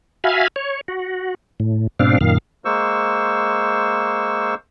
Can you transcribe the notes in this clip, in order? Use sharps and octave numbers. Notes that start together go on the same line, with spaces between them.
F#4 E5 F5 G#5 B5 F6
C#5
F#4
A2
G#2 B2 C4 D4 F5
F#2 A#2 D#3 F5
G#3 A#3 C5 C#6 E6